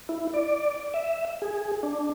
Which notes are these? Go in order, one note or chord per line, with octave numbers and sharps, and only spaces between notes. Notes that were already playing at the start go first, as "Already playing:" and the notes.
E4
D5
E5
G#4
D4